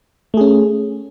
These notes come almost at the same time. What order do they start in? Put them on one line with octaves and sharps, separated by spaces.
A3 G#4 C#4